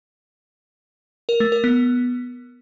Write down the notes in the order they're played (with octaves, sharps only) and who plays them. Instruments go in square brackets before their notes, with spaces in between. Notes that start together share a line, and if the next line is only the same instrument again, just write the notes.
[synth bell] A#4
A3
A#4
B3